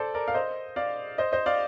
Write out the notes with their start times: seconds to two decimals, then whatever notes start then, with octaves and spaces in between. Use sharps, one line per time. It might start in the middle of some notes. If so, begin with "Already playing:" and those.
Already playing: A4 C5 D5
0.14 A#4 D5
0.28 F5
0.34 C5 D#5
0.76 D5 F5
1.18 C5 D#5
1.32 C5 D#5
1.46 D5 F5